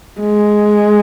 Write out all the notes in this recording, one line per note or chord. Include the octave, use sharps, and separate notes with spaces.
G#3